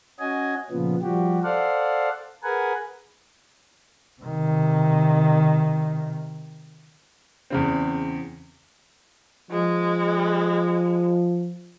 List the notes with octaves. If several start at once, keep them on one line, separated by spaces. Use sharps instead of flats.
C#4 F#4 D#5 G#5
A#2 C#3 F3 B3
F3 G3 F#4 G4
A4 C5 D5 F5 F#5
G#4 A#4 B4 F#5 G#5
C3 D#3
E2 C#3 C4
F3 G#3